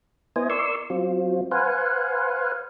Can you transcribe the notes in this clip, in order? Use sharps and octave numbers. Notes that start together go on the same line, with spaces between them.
B3 E4 C5 D#5 G#5
A#4 D5 C6 C#6 E6
F#3 C4 F4
B4 C5 F5 F#5 G#5